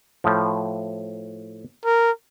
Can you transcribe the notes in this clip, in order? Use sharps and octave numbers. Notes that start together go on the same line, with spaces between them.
A2 F3
A#4